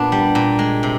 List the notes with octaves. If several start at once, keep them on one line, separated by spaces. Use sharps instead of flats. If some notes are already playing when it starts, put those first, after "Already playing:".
Already playing: A#2 B3 D4
G3
A#2
G#3
C3